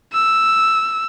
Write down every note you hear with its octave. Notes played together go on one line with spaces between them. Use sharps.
E6